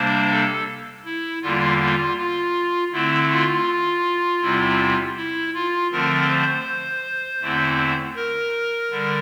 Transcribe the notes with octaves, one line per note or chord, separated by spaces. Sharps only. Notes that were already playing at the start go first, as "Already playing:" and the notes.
Already playing: C3 G3 A#3 D4 C5
A4
E4
E2 D3 G3 A#3 F4
F4
F4
D3 A3 C4 E4
F4
E2 C3 G3 C4 E4
E4
F4
D3 F3 A3 C4 A#4
C5
E2 D3 A3 C4 E4
A#4
D3 G3